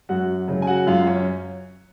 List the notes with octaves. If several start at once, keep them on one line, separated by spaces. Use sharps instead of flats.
F#2 F#4 F#5
C#3 F#3
G#5
F#4 F#5
F#2 F4 F5
C#4 C#5